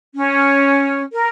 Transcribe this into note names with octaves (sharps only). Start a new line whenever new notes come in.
C#4
A#4